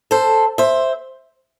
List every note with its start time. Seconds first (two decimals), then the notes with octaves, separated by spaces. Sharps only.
0.11 A4 C5
0.58 C5 E5